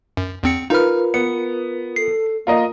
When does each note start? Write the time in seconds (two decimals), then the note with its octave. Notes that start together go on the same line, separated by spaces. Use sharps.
0.17 F#2
0.43 E2 C4 C#7
0.70 D#4 F4 A#4 B4 F6
1.14 B3 C#7
1.96 A4 C7
2.47 A#3 F4 A#4 D#5